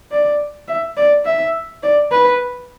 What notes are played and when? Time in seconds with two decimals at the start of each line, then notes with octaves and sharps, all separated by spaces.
0.11 D5
0.68 E5
0.97 D5
1.25 E5
1.83 D5
2.12 B4